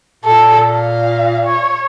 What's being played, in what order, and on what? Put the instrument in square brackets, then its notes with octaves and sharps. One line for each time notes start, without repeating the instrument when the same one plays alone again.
[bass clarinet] A#2 [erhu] A4
[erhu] F5
C#5